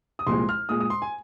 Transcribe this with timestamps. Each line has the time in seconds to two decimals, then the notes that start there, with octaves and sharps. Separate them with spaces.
0.19 D#6
0.27 C2 A#2 F3 G#3 C6
0.49 F6
0.69 A#2 G#3 D#6
0.80 D#6
0.90 C6
1.02 G#5